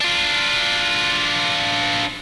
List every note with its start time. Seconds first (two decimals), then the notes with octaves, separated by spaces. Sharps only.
0.01 D4 F4